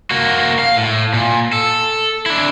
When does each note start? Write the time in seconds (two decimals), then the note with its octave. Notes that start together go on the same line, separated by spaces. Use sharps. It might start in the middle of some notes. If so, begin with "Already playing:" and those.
0.11 A#3 F#4
0.59 F5
0.77 A2
1.14 A#2
1.53 A4
2.26 D4 E4